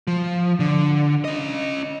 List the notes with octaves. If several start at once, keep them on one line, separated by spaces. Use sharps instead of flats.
F3
D3
C#4 D#5